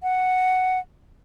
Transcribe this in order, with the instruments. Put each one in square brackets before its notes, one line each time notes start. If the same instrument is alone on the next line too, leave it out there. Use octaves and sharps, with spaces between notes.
[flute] F#5